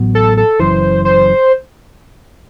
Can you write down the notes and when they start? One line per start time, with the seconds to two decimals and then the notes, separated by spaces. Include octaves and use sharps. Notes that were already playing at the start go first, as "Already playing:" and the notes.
Already playing: A1 A2 F#3 B3
0.15 A4
0.37 A4
0.60 F#1 F#2 E3 C5
1.05 C5